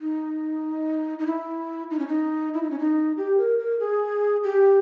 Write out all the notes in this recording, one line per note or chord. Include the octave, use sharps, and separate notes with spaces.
D#4
D#4
E4
D#4
C#4
D#4
E4
D#4
C#4
D#4
G4
A#4
A#4
G#4
G4